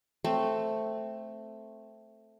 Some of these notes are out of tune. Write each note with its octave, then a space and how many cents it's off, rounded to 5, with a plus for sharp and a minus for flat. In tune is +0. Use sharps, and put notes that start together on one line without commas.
A3 +0 C4 +0